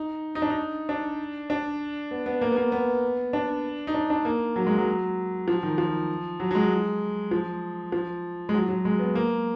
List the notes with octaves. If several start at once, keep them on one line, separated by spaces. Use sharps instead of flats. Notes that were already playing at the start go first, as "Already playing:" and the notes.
Already playing: D#4
D#4
D4
D#4
D4
D4
B3
B3
A#3
B3
A#3
B3
D4
D#4
D4
D4
A#3
F#3
G#3
F#3
F3
D#3
F3
F#3
F#3
G#3
F3
F3
G#3
F#3
F#3
G#3
B3
A#3